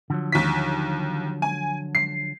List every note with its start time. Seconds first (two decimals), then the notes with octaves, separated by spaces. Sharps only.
0.10 D3 F3 F#3
0.32 D#2 B6
1.42 G#5
1.95 C7